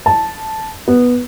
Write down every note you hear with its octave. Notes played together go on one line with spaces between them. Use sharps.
A5
B3